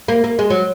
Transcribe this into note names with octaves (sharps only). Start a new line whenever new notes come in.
A#3
A#3
G#3
F#3